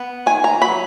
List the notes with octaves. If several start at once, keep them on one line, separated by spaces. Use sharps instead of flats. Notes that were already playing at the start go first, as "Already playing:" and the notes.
Already playing: B3
D#3 G#5
A#5
F#3 B5